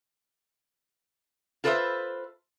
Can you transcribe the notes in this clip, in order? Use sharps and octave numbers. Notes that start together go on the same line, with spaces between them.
F4 A4 B4 C5 D5 E5